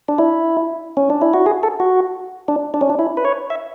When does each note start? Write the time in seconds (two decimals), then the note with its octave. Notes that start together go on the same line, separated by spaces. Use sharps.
0.08 D4
0.18 E4
0.97 C#4
1.10 D4
1.22 E4
1.34 F#4
1.46 G#4
1.63 A4
1.80 F#4
2.48 D4
2.74 D4
2.81 C#4
2.90 D4
2.99 E4
3.17 B4
3.25 C#5
3.50 E5